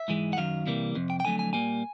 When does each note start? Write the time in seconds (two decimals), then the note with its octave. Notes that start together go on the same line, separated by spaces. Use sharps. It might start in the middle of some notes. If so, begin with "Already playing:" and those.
Already playing: E5
0.08 G#2 E3 G#3
0.33 F#5
0.37 F#2 D#3 F#3 F5
0.66 C3 E3 G3 A#3
0.95 F2 C3
1.10 G5
1.20 G5
1.25 F2 D3 F#3 A3 G#5
1.39 G#5
1.53 A#2 G3 A#3 G#5